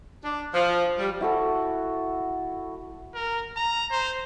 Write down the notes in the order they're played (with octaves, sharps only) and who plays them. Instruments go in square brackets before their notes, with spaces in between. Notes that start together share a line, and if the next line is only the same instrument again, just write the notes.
[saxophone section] D4
F3
G3
[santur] E4 F#4 A4
[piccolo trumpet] A#4
A#5
C5